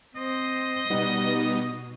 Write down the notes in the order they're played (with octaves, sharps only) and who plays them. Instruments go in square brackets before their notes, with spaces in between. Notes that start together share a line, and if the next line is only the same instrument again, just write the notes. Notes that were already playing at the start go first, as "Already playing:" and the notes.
[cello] C4 C5 [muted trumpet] D#5
[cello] B2 [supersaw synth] G3 B3 D#4